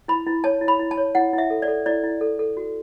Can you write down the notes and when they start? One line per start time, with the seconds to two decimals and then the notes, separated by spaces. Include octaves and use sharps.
0.08 E4 B5
0.26 E4
0.44 C#5 A5
0.61 E4
0.68 B5
0.79 E4
0.91 A5
0.97 C#5
1.15 E4 F#5
1.33 E4
1.38 E5
1.50 A4
1.62 D5
1.68 A4
1.86 E4 D5
2.03 E4
2.21 A4
2.39 A4
2.57 F#4